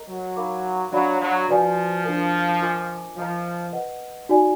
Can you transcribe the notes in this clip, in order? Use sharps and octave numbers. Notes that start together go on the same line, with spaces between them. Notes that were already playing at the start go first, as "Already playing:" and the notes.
Already playing: A#4 D#5 A#5
F#3
D#4 A#4 F5 B5 D6
F#3 D4 F#4 D5 F5 B5
F#3
F3 F#4 B4 D5 G#5
D4 F4 A#4
F4 A#4 D#5 G#5 D6
F3 A#4 D#5 A#5
B4 D#5 F#5
D#4 F#4 D5 G#5